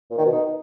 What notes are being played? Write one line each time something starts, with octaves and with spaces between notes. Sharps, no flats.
A#2
D#3
B2
D#4